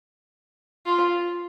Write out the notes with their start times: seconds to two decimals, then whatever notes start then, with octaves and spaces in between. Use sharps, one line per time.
0.86 F4